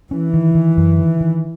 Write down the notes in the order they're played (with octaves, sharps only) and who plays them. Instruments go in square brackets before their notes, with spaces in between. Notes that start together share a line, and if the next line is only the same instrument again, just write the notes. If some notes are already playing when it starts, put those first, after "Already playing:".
[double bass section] E3 [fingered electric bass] C#4
[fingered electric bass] D#3
D#3
F#2
D#3
D#3